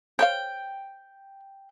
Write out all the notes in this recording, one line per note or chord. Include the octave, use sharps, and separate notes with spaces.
C5 C#5 F5 G5